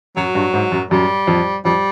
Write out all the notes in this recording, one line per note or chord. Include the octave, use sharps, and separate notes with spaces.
F#2 F#3
G2
G#2
F#2
F#2 G3
F2
F2 G3